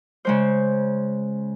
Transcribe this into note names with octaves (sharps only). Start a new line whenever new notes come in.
C#3 G#3 C5